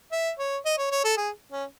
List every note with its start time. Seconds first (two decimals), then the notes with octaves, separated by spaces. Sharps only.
0.12 E5
0.39 C#5
0.65 D#5
0.78 C#5
0.91 C#5
1.04 A4
1.17 G#4
1.52 C#4